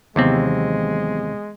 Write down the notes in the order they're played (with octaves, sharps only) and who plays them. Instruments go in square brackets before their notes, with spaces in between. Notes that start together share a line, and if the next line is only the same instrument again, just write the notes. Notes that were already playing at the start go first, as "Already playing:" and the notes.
[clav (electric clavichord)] D#2 C3 C4 [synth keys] E3 F#3 B3 [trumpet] G#3